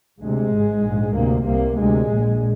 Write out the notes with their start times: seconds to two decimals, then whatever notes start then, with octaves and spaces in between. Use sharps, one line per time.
0.20 D2 C3 G#3
0.51 G#1 G#2
0.82 A#1 G#2
1.14 D2 C3 A#3
1.45 C2 C3 A#3
1.76 D2 C3 G#3
2.07 A#1 A#2